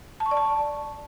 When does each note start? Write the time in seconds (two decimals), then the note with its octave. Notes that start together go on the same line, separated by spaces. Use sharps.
0.20 A5
0.26 C#6
0.31 D5
0.37 A5